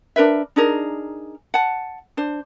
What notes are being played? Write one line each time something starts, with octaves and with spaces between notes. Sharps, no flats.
D4 A#4 B4 E5
D4 D#4 G#4 A#4
F#5 A5
D4 C5